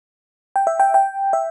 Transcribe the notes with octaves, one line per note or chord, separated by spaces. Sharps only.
G5
E5
G5
G5
E5